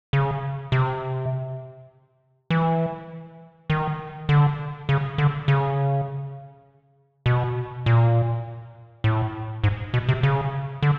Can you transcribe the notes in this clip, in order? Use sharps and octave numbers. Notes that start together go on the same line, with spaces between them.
C#3
C3
E3
D#3
D3
C#3
D3
C#3
B2
A#2
A2
G#2
B2
C3
C#3
D3